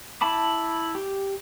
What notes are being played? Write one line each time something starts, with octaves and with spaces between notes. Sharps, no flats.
E4 A5 B5 D6
G4